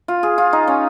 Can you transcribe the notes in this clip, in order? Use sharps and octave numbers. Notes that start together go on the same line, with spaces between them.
F4
G#4
F4
D#4
C#4